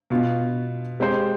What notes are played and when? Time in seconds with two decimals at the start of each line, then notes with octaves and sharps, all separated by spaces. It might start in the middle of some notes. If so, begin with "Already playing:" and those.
0.10 B2 B3 F4
1.00 G#3 C4 G4 C5